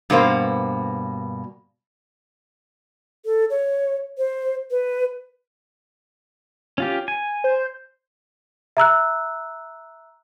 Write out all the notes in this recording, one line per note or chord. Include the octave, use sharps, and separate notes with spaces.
G2 B2 A#3 C5
A4
C#5
C5
B4
C#4 F4 G4
G#5
C5
E5 A#5 E6 F#6